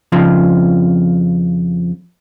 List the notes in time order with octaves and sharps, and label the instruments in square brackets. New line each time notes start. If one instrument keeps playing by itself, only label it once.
[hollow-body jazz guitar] F2 C#3 F3 C4